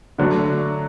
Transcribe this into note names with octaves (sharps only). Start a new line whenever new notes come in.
D3 F#3 A3 D4